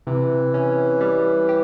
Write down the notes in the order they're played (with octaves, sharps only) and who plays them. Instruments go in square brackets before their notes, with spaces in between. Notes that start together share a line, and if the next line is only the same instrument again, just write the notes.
[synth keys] C3 [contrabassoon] E3
[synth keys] C#4
G3
G4